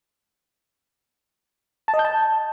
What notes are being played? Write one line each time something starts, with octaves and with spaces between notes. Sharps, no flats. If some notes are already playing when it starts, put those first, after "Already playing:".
A5
D#5
G6
A5